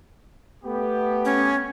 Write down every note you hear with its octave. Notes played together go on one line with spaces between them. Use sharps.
A3 B3 G4
C#4